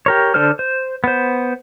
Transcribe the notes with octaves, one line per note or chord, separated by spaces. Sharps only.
G4 A#4 C#5
D3 D4 A4 C5 F6
C5
B3 C5